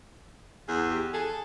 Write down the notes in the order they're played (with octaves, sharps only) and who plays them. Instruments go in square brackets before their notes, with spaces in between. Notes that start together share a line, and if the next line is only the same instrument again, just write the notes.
[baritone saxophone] E2 [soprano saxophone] G#4
[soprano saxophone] G4
[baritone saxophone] G#4 [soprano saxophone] A4